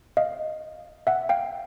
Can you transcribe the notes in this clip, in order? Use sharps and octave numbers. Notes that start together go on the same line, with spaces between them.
D#5 F5
E5 F#5
F5 G5